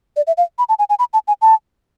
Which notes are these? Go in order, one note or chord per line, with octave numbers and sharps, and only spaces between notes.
D5
E5
F5
B5
A5
G#5
G#5
B5
A5
G#5
A5